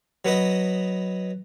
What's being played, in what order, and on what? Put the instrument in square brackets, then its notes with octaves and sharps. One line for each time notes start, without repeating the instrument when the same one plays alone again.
[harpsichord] F#3 B3 B4 D#5